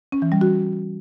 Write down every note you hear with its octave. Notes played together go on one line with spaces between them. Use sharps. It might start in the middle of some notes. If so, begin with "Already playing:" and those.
C#4
E3
G3
F#4